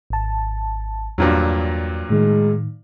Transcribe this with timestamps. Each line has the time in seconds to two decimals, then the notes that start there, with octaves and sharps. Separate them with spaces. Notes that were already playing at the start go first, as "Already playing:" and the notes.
0.10 G#1 A5
1.18 E2 G2 A#2 F#3
2.10 A2 D#3 G#3